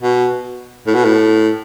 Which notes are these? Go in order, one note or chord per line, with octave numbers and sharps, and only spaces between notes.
B2
A2
B2
A2